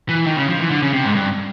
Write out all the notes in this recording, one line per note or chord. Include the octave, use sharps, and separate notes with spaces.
E3
D#3
C#3
F3
E3
D3
C#3
C3
G#2
G2